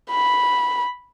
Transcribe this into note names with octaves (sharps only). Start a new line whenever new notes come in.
B5